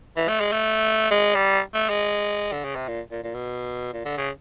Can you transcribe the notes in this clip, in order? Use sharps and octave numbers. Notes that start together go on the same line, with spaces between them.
E3
A3
G#3
A3
G#3
G3
A3
G#3
D3
C#3
C3
A#2
A#2
A#2
B2
A#2
D3
C#3